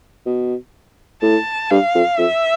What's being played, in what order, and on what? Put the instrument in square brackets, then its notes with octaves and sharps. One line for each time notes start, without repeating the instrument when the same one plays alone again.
[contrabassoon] B2
[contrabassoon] A2 [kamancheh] A5
[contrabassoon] G2 [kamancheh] F5
[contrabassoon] F2
[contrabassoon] F2 [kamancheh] E5